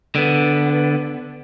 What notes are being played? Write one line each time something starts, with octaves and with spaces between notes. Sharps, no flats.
D3 B3